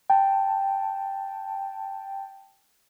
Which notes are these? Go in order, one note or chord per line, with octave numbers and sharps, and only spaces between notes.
G5 A5